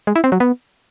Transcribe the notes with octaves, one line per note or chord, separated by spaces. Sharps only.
G#3
E4
C4
F#3
B3